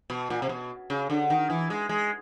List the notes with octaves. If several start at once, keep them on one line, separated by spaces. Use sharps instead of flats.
B2
A#2
C3
B2
C#3
D3
D#3
E3
G#3
G#3